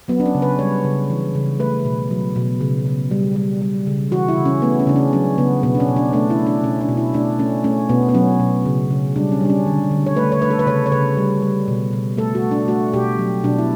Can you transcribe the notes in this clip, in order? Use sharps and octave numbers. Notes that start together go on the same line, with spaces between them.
F#3 B3
D4
C#4
C#3
B4
G3 C#5
C#3
E3
C#3
A3 B4
B2
F#3
B2
C#3
C#3
G3
G3
G3
C#3
E3 F#4
E4
C#3
C#4
A3 B3
C#4
C#3 D4
C#4
F#3 C#4
C#3 B3
B2 B3
D4
C#4
B2
D4
A3 D4
E4
A3
D4
B2 C#4
D4
B2
E4
A3 D4
A3 C#4
A3 C#4
B2 B3
B3
F#3 C#4
B2
C#3
C#3
G3 D4
C#4
G3 D4
C#4
D3
D3
C#5
A3 B4
C#5
A3 B4
A4
B4
C#3 C#5
C#5
C#3 B4
G3
G3
B2
B2
A3 A4
F#4
A3
D4
A3 F#4
B2 G4
F#3
B2 D4
E4